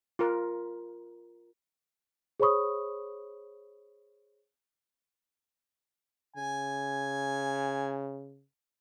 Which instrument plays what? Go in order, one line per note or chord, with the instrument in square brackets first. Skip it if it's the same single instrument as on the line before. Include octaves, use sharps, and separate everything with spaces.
[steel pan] F4 A#4
[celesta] G#4 C5 C#5 B5 C#6 D#6
[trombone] C#3 [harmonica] G#5